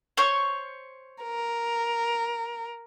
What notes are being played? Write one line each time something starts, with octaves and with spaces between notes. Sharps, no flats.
C5 C#5 C#6
A#4